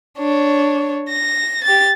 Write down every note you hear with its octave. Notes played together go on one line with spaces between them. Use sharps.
D4 C#5
A#6
G4 A6